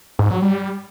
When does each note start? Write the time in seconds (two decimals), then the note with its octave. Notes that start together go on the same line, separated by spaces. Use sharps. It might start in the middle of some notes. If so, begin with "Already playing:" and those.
0.19 G#2
0.30 F#3
0.42 G3